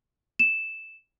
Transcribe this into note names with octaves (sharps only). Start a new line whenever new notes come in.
E7